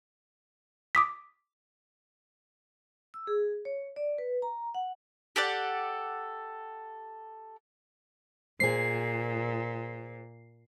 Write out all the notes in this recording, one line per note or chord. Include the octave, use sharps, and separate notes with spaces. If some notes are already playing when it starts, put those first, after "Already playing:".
D6 D#6 B6
E6
G#4
C#5
D5
B4
A#5
F#5
G4 A4 D5 F#5
A#2 G#4 C5 C7